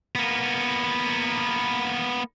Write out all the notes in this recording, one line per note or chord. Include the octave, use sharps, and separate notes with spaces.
A#3 B3